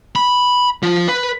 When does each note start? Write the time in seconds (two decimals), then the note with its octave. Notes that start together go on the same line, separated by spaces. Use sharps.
0.16 B5
0.83 F3
1.08 B4